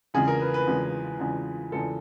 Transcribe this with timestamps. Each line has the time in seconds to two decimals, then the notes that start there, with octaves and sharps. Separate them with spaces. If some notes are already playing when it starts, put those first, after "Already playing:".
0.14 E2 C#3 F3 G#3 G#4
0.28 A#4
0.41 B4
0.54 B4
0.67 E2 C#3 F3 G#3
1.19 E2 C#3 F3 G#3
1.72 E2 C#3 F3 G#3 A4